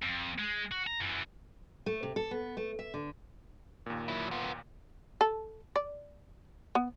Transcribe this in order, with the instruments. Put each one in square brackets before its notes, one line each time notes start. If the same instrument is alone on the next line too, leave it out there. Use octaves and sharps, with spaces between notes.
[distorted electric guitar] F2
G#3
F#4
A#5
F#2 E3
[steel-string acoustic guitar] A3
C3
A4
B3
A3
E5
D3
[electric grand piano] D#2 A#2
[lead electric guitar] F#3 E4
B3 F4
[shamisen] A4
D5
B3